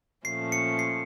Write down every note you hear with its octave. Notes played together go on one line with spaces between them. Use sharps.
A#2 F3 A3 C#4 C7
C#7
C7